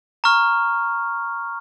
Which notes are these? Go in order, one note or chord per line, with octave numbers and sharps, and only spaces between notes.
A#5 C#6 F6